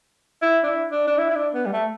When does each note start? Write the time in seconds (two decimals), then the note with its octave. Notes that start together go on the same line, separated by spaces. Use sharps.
0.42 E4
0.64 D4
0.67 E4
0.92 D4
1.07 D4
1.18 E4
1.30 E4
1.35 D4
1.54 B3
1.66 G3
1.73 A3